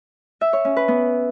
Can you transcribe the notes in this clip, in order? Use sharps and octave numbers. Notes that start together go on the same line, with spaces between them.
E5
C#5
C#4
B4
B3